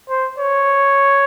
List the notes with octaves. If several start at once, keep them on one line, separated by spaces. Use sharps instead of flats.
C5
C#5